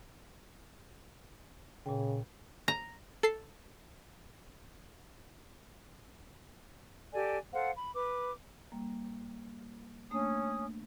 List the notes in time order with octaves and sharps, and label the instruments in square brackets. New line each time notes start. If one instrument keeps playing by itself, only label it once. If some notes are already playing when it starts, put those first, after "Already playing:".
[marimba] A#2 G5 [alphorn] C#3
[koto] A#5
[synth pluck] A4 C7
[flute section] G4 A4 D5 G#5
A4 C5 F5 F#5
B5
B4 D6
[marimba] G3 A#3
[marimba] A3 A#3 D4 [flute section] C#4 D#6